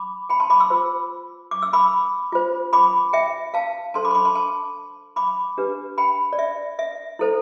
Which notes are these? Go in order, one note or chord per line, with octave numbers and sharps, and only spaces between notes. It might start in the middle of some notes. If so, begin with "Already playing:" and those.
Already playing: B5 D6
G5 B5
A5 C6
B5 D6
C6 E6
F4 C5
D6
E6
B5 D6
F4 C5
B5 D6
E5 G5
F5 A5
D4 A4 C5 A5 C6
B5 D6
C6
B5 D6
A5 C6
A5 C6
B5 D6
D4 G4 B4
G5 B5
D5
E5
E5
E4 A4 C5